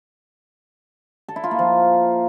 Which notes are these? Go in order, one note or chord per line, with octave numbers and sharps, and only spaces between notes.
A4
E4
F4
A#3
F3